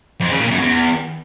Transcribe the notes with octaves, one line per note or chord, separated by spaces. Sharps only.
F2
C#3
A#2
F#2
E2